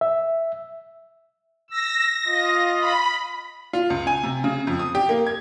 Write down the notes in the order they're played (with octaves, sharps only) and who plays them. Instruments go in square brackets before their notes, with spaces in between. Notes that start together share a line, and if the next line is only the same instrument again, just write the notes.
[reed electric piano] E5
[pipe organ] E6 [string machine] A#6
[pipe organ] F4 D#5
[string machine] B5
[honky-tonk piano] F4
C#2
G#5
C3
C#3
F2
D#6
G4
A#3
G#6